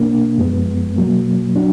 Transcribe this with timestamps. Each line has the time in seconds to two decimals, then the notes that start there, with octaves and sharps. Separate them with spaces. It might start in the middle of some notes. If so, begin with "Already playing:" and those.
Already playing: B2 A#3 D4
0.38 F#2 F3 G#3 B3
0.96 B2 F#3 A#3
1.56 F#3 D4